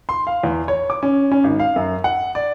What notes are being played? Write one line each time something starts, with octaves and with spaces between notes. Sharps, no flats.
C6
F5
E2
C#5
D6
C#4
C#4
G#1
F5
F#2
F#5
D5